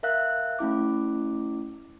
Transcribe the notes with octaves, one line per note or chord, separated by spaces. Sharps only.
A#4 E5 F5 F#6
A3 C#4 E4 D6